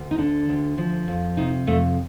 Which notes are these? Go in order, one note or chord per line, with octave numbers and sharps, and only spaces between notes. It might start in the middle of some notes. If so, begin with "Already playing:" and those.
Already playing: D2
D#4
D3 D4
D2
F3
F2
C3 D#4
F2 A3